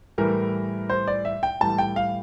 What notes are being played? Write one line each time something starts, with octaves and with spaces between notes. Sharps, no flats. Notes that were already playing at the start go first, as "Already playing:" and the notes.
A2 E3 G3 A#4
C5
D5
E5
G5
A2 E3 G3 A5
G5
F5